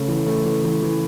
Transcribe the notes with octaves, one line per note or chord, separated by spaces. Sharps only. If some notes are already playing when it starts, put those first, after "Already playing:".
Already playing: C#3 A3
E3
A3
E3
E3
E3